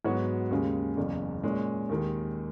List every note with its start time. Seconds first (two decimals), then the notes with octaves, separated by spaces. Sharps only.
0.05 G#2 F#3 B3 F#4 C#5
0.51 D#2 C#3 G#3
0.97 F#1 E2 C#3
1.43 A#2 G#3 C#4
1.89 D#2 D#3 G#3